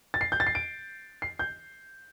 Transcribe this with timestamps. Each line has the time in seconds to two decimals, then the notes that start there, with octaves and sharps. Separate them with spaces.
0.14 A6
0.21 C7
0.32 G6
0.40 A6
0.47 C7
0.55 D7
1.22 C7
1.39 G6